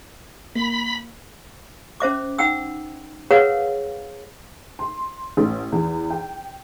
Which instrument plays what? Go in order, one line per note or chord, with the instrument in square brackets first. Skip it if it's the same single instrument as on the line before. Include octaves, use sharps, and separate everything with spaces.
[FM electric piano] A#3 [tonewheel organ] B5
[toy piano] C#4 C5 E5 D6
D#4 F#5 G5 E6
G#4 A#4 B4 C#5 F5 F#5
[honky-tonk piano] C6
A1
E2
G5